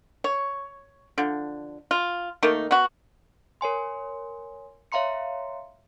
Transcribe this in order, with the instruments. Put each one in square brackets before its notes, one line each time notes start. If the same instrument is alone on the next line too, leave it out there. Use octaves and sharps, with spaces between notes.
[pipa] C#5
D3 F3
F4
D#3 A3 A#3 D#4
B3 F#4
[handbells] A#4 C#5 G#5 C6
C#5 E5 F5 A#5 C6 C#7